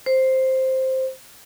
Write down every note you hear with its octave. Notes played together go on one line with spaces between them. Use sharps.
C5